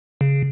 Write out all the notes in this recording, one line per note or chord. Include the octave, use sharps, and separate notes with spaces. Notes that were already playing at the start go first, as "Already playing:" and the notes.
C#3